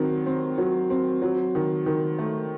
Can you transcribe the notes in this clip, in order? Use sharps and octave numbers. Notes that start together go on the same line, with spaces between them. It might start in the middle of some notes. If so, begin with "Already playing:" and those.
Already playing: D#3 F#3 C4
C4
F#3
C4
F#3
D#3
D#3
A3